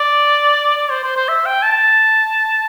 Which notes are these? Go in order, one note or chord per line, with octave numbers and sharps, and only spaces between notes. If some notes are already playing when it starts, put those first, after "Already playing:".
Already playing: D5
D5
C5
C5
C5
E5
G5
A5